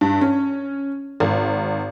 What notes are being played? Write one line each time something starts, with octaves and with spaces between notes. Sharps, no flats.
G2
C#4
G#1